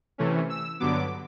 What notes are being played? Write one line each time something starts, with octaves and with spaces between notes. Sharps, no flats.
C3 E3 A3 C#4
E6
G2 D3 F#3 B3 D6